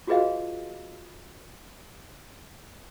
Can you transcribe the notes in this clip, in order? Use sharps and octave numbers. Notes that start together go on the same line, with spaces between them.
F4 F#4 G#4 B4 D#5 F5